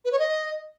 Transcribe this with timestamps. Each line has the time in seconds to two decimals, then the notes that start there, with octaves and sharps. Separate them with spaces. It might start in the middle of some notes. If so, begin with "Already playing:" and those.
0.05 B4
0.12 C#5
0.19 D#5